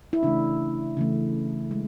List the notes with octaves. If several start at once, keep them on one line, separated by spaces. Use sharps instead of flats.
E4
C#3 E3 A3 D4
C#3 E3 A3
G#3